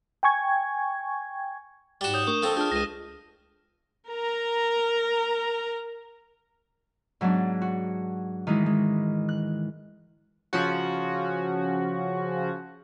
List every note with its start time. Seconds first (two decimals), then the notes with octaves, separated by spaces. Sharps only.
0.23 G5 G#5 C#6 G#6
2.01 G#2 G3 F#4 E7 G7
2.14 C#5 D#6 G6
2.27 A3 D4 A#4 C#6
2.43 F3 C4 A4
2.57 D4 F4 G#4 F6 G6
2.72 C#2 A#6 D#7
4.09 A#4 A#5
7.21 G#2 F#3 B3 D4
7.62 F#4
8.47 D#3 E3 G#3 E4
8.66 G#3
9.29 F#6
10.53 C#3 F3 C#4 F#4